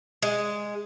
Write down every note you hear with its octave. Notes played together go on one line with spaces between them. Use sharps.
G#3